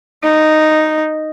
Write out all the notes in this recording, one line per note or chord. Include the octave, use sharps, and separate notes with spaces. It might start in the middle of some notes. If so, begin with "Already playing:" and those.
D#4